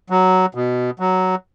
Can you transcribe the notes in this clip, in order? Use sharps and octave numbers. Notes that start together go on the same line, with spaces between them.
F#3
B2
F#3